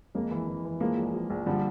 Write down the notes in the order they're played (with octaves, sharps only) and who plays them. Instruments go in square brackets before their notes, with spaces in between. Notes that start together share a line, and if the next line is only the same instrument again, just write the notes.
[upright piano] F2 [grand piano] G#3 A#3
[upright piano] E3
E3
E3
[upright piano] F3 [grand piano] G#3 A#3
[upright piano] A#1
F3
A#1
[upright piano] D3 [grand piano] F3 G3